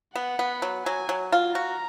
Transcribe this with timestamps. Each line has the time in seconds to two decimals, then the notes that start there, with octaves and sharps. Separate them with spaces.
0.15 B3 F#5
0.39 B3
0.62 F#3
0.85 F#3 G#5
1.09 F#3
1.32 F4
1.55 F#4 A#5